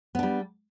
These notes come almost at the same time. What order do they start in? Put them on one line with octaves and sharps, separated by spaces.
B3 D4 G3